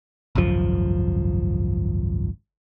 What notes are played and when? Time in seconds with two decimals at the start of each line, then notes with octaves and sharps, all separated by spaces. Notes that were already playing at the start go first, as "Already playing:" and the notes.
0.35 G#1 C#2 F#2 F3